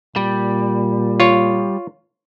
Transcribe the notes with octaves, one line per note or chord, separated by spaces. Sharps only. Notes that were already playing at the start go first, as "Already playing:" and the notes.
A#2 G3
F4 C#5